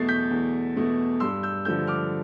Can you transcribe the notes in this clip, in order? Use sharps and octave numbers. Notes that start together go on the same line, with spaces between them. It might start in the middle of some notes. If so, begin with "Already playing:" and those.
Already playing: E2 B2 A3 A6 C7
G6 B6
E2
B2 A3
G2 C6 E6
E6 G6
D3 F3 A3 E6 G6
D6 F6